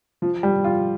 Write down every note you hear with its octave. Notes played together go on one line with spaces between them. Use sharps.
F3
G3
F4